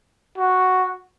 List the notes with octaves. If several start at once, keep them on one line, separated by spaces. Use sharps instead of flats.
F#4